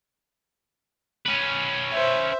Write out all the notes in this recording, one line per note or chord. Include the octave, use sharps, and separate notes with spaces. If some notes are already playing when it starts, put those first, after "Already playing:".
C#4 B4
C5 E5